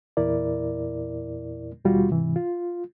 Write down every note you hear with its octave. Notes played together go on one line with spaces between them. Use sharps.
E2 A#2 E4 A#4 D5
D#2 B2 G3 F4 F#4
G#2 C3 E3
F4